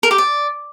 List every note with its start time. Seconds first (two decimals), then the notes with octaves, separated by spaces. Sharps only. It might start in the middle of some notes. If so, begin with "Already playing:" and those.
0.03 A#4
0.11 G4
0.18 D5